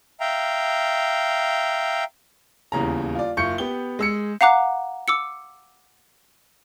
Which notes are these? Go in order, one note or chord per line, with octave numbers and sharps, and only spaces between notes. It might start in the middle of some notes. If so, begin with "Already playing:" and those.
E5 F5 G5 A#5
D#1 E2 C#3 A#5
F4 D5
F#1 F4 C#6 G6 C#7
B3 G4 G7
G#3 E6 C#7
F5 F#5 A#5 D6 F#6
D6 E6 C#7